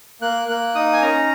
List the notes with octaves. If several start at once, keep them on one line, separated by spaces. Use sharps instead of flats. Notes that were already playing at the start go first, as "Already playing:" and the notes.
A#3 F#6
A#3 F#6
D#4 D#6
G#5
C#4 A#5